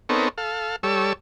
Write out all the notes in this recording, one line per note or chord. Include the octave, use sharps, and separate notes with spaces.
B3 C4 D#4 A4 A#4 C#5
A4 F5
G3 A4 C#5 E6